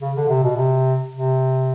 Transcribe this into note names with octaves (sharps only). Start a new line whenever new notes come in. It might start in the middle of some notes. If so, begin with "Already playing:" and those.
C#3
D3
C3
B2
C3
C3